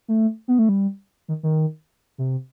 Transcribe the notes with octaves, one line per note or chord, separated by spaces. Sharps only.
A3
B3
A3
G3
D#3
D#3
C3